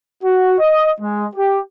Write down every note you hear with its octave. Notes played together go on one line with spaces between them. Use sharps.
F#4
D#5
G#3
G4